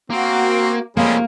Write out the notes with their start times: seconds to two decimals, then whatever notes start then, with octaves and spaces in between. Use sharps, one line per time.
0.10 A#3 C4 F#4
0.97 F2 C3 G3 G#3 A#3 C#4